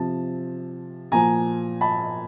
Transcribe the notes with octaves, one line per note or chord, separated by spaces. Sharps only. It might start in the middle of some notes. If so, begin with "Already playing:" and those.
Already playing: C3 F3 A5
A#2 F3 G#5 A#5
A5 B5